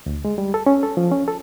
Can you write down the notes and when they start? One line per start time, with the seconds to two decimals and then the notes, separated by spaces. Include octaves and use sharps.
0.06 D2
0.25 G#3
0.38 G3
0.54 A4
0.66 C#4
0.83 A4
0.97 F3
1.12 C#4
1.28 A4